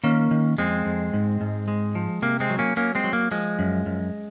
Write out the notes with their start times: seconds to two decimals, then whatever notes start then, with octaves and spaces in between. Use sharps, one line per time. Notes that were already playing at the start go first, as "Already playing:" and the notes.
0.04 D#3 A#3 C#4
0.31 D#3
0.58 F2 G#3 C4
0.86 F2
1.13 G#2
1.41 G#2
1.68 G#3
1.95 F3
2.22 C3 A#3
2.40 G#3 C4
2.50 F#3
2.59 A#3 C#4
2.76 F#3 A#3 C#4
2.95 G#3 C4
3.04 F#3
3.13 A#3
3.31 F3 G#3
3.59 F#2
3.86 F#2